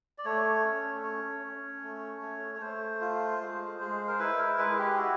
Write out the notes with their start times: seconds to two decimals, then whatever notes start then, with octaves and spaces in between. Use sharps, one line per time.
0.18 D5
0.25 A3 C#5
0.65 C#4
1.04 C#4
1.44 C#4
1.83 A3
2.22 A3
2.55 C#5
2.61 A3 C5
3.01 F4
3.41 G#3
3.80 G#3
4.08 A#4
4.19 E4 B4
4.38 A#4
4.58 G#3 B4
4.78 G4
4.97 E4 F#4